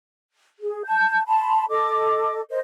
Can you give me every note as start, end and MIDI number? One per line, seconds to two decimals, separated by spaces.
0.61 0.82 68
0.85 1.22 81
0.85 1.22 91
1.26 1.64 81
1.26 1.64 83
1.26 1.64 84
1.69 2.40 69
1.69 2.40 75
1.69 2.40 86
2.50 2.59 70
2.50 2.59 72
2.50 2.59 75